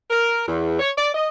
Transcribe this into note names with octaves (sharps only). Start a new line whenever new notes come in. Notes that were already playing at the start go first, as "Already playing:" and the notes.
A#4
E2
C#5
D5
D#5